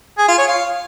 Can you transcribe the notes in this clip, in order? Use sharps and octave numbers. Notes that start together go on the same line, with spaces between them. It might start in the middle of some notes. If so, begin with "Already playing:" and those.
G#4
F4
C#5
F5